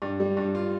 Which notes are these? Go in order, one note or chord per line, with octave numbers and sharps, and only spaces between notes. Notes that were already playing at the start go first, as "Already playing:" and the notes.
G2
G3
G2
F4